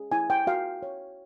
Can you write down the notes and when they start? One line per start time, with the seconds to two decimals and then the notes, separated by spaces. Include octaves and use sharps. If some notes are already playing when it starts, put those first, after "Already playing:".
Already playing: G#4
0.12 E4 G#5
0.30 G5
0.47 F#4 F5
0.83 C#5